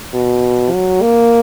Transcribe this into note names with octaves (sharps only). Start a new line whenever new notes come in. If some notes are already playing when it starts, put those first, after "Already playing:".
B2
F#3
A#3